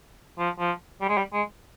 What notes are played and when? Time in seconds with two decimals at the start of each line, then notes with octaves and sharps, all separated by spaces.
0.39 F3
0.59 F3
1.01 G3
1.09 G#3
1.17 G3
1.33 G#3